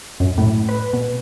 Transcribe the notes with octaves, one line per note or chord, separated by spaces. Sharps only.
F#2
A2
B4
B2